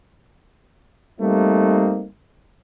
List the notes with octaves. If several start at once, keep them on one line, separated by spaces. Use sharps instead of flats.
G3 A3 A#3 C4 D#4